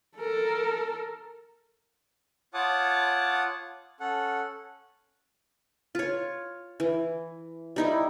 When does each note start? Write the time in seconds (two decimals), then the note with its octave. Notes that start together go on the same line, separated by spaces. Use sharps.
0.18 A4 A#4
2.54 F4 C#5 F#5 A5 D6 D#6
4.00 C#4 A4 F#5
5.95 F4 C#5
6.80 E3
7.76 G3 D#4 E4